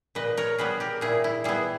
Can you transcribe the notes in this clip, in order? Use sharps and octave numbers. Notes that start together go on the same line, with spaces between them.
A#2 B4 D#5
A#4 C#5
G3 B3 G#4 B4
G4 A#4
A#2 E4 G#4
E4
G3 B3 E4 G#4